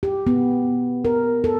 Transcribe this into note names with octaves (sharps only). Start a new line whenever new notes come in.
G4
B3
A#4
A4